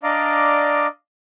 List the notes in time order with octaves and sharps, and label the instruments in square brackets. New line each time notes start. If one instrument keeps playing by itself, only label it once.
[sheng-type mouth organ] D4 D5 D#5 F5 A#5 D6